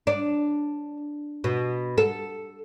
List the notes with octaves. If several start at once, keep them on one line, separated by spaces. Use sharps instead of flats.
D4
B2
A4